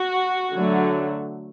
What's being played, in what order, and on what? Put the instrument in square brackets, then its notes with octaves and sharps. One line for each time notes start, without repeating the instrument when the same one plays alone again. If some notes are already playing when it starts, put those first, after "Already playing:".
Already playing: [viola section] F#4
D3 F#3 A3